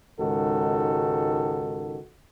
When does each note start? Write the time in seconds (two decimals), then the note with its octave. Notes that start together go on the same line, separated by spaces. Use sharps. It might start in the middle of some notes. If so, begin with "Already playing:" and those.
0.21 C#2 G#2 D#3 F#4 A4